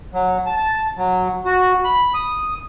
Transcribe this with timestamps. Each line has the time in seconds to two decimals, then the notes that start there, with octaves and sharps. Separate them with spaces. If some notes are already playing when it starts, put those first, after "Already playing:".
0.14 F#3
0.46 A5
0.57 A5
0.97 F#3
1.45 F#4
1.84 B5
2.14 D#6